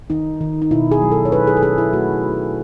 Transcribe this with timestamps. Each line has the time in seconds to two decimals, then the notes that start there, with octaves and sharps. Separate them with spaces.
0.10 D#3 D#4
0.41 D#3
0.62 D#4
0.71 B2 E4
0.92 G#4
1.02 F#3
1.12 A4
1.25 C#5
1.32 C#4 B4
1.47 G#4
1.57 A4
1.63 C#4 G#4
1.78 E4
1.93 A3 F#4
2.24 F#3